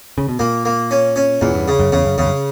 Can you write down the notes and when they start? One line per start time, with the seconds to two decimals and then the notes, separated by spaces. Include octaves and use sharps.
0.18 C#3
0.29 B2
0.39 A#2 A#3
0.65 A#3
0.91 C#4
1.16 C#4
1.41 E2 A#2
1.54 G2
1.68 C#3
1.79 F#2
1.92 E2 C#3
2.05 F#2
2.18 E2 C#3
2.26 F#2